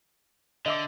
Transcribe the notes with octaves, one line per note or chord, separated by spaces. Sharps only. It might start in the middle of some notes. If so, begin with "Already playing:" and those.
D3 D#5 E5 D6